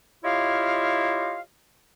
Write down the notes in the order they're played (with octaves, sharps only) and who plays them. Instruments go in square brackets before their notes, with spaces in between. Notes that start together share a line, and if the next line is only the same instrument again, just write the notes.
[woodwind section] E4 F4 G4 C#5 D#5 F5